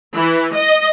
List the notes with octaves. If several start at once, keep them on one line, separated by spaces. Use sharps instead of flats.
E3
D#5